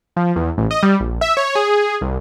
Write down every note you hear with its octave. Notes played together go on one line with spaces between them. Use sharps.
F3
E2
A1
D#5
G3
A#1
E5
C#5
G#4
C2